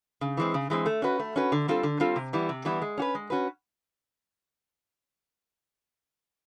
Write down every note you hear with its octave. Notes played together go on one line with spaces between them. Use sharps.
C#3
E3 G#3 C4
C#3
E3 G#3 C4
A3
C#4 F#4 B4
A3
C#4 F#4 B4
D3
G3 C4 F4 A4
D3
G3 C4 F4 A4
C3
E3 G3 B3 E4
C3
E3 G3 B3 E4
G#3
C#4 F#4 B4
G#3
C#4 F#4 B4